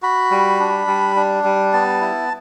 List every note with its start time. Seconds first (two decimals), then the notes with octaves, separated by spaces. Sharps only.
0.02 F#4 B5
0.31 G3
0.60 D4
0.87 G3
1.16 D4
1.44 G3
1.73 B3 A5
2.01 E4